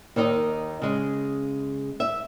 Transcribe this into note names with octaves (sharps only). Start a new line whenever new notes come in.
D#2 D#3 D#4 D#5
C#3 G#3
E5